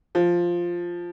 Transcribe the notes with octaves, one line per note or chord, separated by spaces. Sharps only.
F3